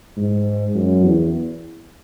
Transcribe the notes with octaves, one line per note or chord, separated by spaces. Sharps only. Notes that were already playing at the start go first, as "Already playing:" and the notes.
G#2
F#2
E2